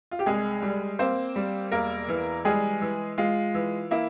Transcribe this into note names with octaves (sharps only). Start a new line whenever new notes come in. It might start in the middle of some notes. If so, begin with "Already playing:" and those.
F4
G4
C2 G#3 G#4
G3
A#3 C4 C5
G3
E1 A#3 A#4
E3
G3 G#3 G#4
E3
G#3 F4
E3
A#3 E4